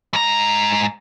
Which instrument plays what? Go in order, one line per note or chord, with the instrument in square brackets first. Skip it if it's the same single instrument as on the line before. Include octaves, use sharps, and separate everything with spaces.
[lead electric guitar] G#2 A#5